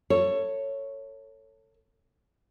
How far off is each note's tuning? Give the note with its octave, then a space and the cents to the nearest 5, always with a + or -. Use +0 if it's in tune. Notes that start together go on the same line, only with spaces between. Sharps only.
A4 +25 C#5 +0